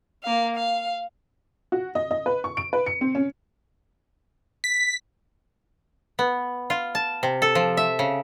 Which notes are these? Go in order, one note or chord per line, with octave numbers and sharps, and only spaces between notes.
A#3 F5
F5
F#4
D#5
D#5
B4
C#6
D7
B4
C#7
C4
C#4
B6
B3
F4
A5
C3
A4
F3
E5
C#3